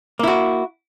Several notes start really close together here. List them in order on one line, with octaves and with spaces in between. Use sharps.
A#3 E4 F#4